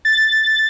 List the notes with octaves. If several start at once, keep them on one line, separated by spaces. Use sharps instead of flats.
A6